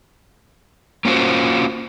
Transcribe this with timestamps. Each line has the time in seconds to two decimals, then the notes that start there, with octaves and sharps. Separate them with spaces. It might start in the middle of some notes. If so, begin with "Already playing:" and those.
1.05 A#3 C#4 F4 F#4 C5